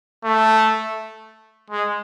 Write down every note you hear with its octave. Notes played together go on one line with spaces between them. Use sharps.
A3
G#3